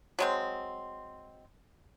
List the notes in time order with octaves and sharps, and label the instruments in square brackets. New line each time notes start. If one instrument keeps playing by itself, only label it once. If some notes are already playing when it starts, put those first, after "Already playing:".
[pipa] F#3 G#3 C4